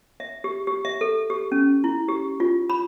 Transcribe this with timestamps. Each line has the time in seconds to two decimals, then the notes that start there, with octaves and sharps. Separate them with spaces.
0.20 E5
0.44 G4
0.67 G4
0.85 E5
1.01 A4
1.30 G4
1.52 C#4
1.84 E4
2.08 G4
2.40 F4
2.70 B5